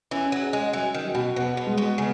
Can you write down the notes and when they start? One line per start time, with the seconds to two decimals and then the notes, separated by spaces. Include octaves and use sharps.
0.11 E3 C#4
0.32 F#3
0.42 G#4
0.53 G#3
0.73 E3 F#3
0.94 D#3
1.05 F#3
1.15 B2
1.36 B2 B3
1.57 B2
1.67 G#3
1.78 B2
1.98 C#3 B3